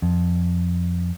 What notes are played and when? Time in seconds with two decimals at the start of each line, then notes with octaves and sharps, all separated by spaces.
0.02 F2